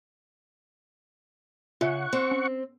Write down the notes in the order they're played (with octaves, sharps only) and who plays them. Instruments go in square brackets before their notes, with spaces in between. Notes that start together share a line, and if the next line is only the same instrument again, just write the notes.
[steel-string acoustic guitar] C#3 [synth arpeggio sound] F4 E5 [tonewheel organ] F#5 C#6
[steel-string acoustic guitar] C4
[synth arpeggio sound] C#4